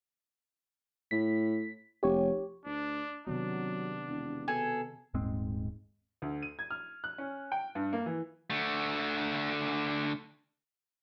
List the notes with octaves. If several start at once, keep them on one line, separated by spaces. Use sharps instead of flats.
A2 B6
F1 G4 C#5
D2 D4
C3 D#3 F#3 B3 D4
E1
B2 G#4 A4
D#1 G#2 G#3 C4
D2
D#7
G#6
F6
F#6
C#4
G5
G2
A#3
E3
D3 A3